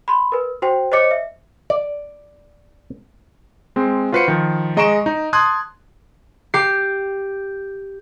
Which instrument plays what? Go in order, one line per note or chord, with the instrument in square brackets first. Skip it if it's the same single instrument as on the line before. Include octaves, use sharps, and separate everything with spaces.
[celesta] B5 C6
A#4 B4
F#4 C5 G5
C5 C#5 D#5 D6 C#7
E5
[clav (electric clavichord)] D5
[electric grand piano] G#3 C4
F4 F#4 B4 C5 C7 C#7
D#3 F3
G#3 D#5 A#5 C#6 D7 E7
D#4
A5 C6 D#6 F#6 G#6
[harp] G4 C7